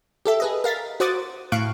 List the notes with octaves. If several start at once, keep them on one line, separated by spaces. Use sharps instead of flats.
G4 A4 E5
G#4 B4 D#5
A#4 F5 A6 B6
F#4 C5 F#5 D6 D#6 A6
A2 F5 C#6 F#6 D7